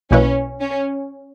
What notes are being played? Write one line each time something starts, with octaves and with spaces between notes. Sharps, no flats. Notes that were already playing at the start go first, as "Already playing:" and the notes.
B1 B2 A#3 C#4 E4 B4
C#4